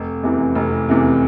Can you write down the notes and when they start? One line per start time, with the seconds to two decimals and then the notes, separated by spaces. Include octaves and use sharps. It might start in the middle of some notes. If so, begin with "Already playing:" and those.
Already playing: F1
0.23 E2 C3 E3
0.55 F1
0.88 E2 C3 E3